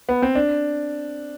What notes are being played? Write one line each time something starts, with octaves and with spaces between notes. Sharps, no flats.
B3
C4
D4